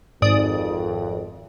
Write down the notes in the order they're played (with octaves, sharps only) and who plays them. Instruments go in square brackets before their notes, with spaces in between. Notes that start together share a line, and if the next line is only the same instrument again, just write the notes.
[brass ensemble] G#1 F2 [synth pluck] G#2 D5 D#6